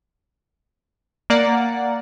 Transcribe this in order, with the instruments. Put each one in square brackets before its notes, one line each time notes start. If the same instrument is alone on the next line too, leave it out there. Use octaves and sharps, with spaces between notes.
[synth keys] A#3 D5 F#5